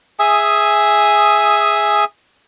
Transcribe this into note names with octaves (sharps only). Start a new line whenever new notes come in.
G#4 E5 G#5 D#6